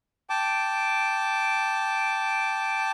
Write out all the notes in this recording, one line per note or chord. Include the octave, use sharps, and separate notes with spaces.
G5 A5 D6